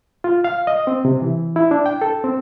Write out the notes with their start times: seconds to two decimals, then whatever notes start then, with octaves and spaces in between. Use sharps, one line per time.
0.24 F4
0.44 F5
0.67 D#5
0.87 C4
1.05 C3
1.22 E3
1.56 E4
1.71 D4
1.86 G5
2.01 A4
2.24 C4